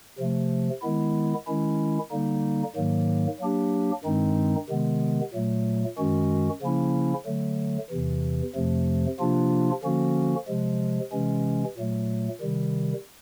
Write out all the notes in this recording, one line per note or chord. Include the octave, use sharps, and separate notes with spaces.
C3 F3 A3
D#3 G#3 B3 E4
D#3 G#3 C#4 E4
D3 G3 A#3 D#4
G#2 D#3 F#3 A#3
F#3 A#3 D4 G4
G2 D#3 G#3 C4 D#4
C3 D#3 G#3 B3
A#2 F#3 A3
F#2 D#3 G#3 C#4 F#4
C#3 F3 A#3 C#4 E4
D3 F#3 A3
E2 C3 E3
F2 C3 F3 A3
C3 F3 A#3 D4 F4
D3 F3 A#3 C#4 F#4
C3 F3 G#3
C3 E3 G#3 C#4
A#2 F#3 A3
C3 D#3 G3